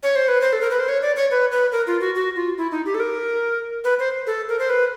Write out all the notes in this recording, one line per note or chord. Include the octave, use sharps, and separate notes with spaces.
C#5
C5
B4
C5
A4
A#4
B4
C5
C#5
D5
C#5
B4
B4
A#4
F4
F#4
F#4
F4
E4
D#4
G4
A4
A#4
B4
C5
A4
A#4
C5
B4